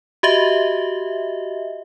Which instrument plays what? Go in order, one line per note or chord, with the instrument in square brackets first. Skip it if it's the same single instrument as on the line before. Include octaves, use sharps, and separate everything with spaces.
[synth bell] F#4 G4 D#5 E5